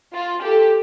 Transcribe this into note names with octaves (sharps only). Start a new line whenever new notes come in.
F4
G4 A4